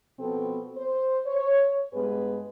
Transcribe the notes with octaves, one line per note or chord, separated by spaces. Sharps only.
B2 F3 B3 C4 A4
C5
C#5
G2 G#3 B3 G#4 B4